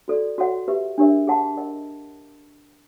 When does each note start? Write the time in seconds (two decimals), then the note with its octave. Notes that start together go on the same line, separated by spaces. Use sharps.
0.08 F#4 A4 D5
0.38 F#4 A4 C#5 F#5
0.68 G4 B4 E5
0.98 D4 G4 A#4 C#5 E5
1.27 G#4 C#5 F#5 A5 C6
1.57 A#4 D#5 F#5